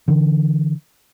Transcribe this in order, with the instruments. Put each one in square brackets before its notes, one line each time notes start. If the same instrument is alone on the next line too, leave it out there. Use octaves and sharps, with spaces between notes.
[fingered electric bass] D3 E3